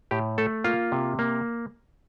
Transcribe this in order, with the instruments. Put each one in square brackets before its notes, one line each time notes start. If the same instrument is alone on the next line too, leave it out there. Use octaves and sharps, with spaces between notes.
[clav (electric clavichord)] A2 G4
A3 A4
A#3 F4
C3
A#3